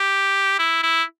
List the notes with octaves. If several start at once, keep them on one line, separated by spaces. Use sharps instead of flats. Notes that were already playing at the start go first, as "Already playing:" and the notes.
Already playing: G4
E4
E4